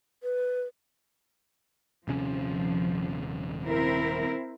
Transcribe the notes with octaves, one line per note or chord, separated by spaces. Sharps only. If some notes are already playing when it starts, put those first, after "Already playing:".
B4
D#1 C3 F3 C#4
C4 E4 A#4